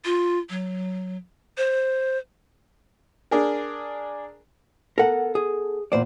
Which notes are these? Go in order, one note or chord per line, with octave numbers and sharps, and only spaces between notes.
F4
F#3
C5
D4 G#4 A#4
B3 A4 A#4 F#5
G#4
E2 A#2 C5 D5